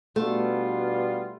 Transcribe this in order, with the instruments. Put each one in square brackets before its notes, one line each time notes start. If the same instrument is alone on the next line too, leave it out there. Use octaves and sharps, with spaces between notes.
[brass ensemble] B2 G3 B3 D4 F4 [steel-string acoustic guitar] A3